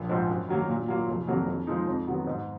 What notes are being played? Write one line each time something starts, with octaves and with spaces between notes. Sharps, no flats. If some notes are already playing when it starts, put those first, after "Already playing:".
Already playing: A#1
G#2 F3
F#2
D#3 F#3 A#3
A#2
F#3 A#3 F4
F1
F2 D#3 F#3 A#3
F2
F3 G#3 D#4
F2
D#3 F#3 B3
G#2